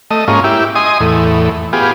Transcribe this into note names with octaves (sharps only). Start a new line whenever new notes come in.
A3 D#5
G#2 A#3 C#4 F4
E4 G4
D#5 G#5 C6 D#6
E2 A2
B3 F4 G4 G#4